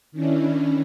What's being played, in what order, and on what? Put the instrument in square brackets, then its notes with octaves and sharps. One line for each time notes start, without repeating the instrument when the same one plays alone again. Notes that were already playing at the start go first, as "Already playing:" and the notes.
[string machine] D#3 C#4 D4 E4